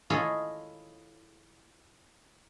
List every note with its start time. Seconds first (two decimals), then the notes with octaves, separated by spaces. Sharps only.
0.10 E4 F4 G#4 A4 C#5 D#5